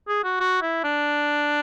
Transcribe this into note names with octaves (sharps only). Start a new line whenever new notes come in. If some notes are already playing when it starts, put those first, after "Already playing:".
G#4
F#4
F#4
E4
D4